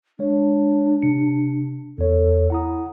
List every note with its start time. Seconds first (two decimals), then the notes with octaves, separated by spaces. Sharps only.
0.19 G#3 D4 C#5
1.02 C3 C#7
1.98 E2 A4 C#5
2.50 E4 F#5 A#5 D#6